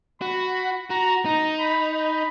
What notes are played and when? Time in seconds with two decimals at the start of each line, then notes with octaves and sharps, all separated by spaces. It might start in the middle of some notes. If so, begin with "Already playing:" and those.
0.21 F#4 B5
0.90 F#4 A#5
1.25 D#4 A#5
1.59 B5
1.93 B5